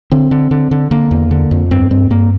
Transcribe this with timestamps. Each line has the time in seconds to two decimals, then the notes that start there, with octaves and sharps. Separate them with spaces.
0.12 D3 C4
0.31 D3
0.51 D3
0.71 D3
0.91 D3 A#3
1.11 E2
1.31 D3
1.51 F2
1.71 G2 C4
1.91 G2 C4
2.10 G2 A#3